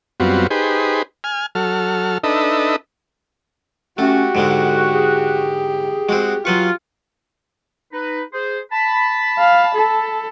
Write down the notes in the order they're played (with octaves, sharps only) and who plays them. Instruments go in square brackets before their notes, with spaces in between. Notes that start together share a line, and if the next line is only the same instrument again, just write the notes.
[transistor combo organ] F#2 G3 B3 C4 F4 F#4
D#4 G4 G#4 B4 C5
G#5 F6
F#3 A4 F6
D4 D#4 A4 B4 D#5 E5
[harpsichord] A3 [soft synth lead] C#4 [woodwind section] F#4 [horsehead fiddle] G4
[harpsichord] G#2 D3 G#3 [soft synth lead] A4
[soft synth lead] G#4
[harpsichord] G#3 C4 [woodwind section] F#4
[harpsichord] F#3 B4 C#6 [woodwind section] F4
[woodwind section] D#4 B4
G#4 C5
A5 B5
[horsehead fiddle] F5
A4